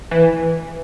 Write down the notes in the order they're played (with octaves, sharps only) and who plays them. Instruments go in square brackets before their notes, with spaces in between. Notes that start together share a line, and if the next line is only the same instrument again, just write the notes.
[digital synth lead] E3